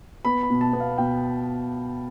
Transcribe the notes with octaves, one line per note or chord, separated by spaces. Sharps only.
B3 B5
B5
B2
A5
B3
F5
B2 G5